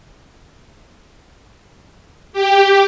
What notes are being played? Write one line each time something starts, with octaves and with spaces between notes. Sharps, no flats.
G4